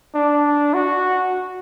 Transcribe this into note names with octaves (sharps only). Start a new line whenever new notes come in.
D4
F#4